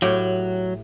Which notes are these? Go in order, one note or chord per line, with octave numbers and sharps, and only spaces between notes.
A2 F#3 G4